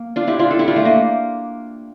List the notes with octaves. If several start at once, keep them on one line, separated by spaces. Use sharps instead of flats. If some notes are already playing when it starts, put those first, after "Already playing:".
Already playing: A#3
D4 F4
E4 G4
D4 F4
F4 A4
E4 G4
D4 F4
A3
A#3